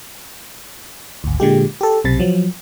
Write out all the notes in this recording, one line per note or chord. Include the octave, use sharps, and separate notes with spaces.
G#1 D2
A#2 D3 G#3 G4
G4 A4
B1 C3 A6
F3 F#3